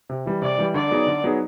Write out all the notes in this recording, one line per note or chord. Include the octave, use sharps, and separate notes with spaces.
C3
E3 G3
C3 D5
E3 G3
D3 D5
F#3 B3 D#4 G#4
D3
F#3 B3 D#4 G#4